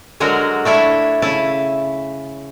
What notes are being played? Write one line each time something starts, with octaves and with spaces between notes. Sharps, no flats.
D3 F#3 G#3 F#4 A#4
A3 D4 E4 C#5
C#3 E4 A5